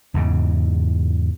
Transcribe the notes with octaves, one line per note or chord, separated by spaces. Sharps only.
E2 G#2 C#3